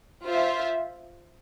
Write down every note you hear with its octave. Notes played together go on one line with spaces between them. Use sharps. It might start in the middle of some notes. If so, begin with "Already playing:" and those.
F4 C5 E5